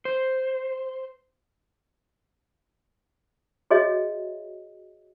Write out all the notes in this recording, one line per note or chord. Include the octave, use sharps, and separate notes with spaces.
C5
F#4 G#4 C#5 D#5 E5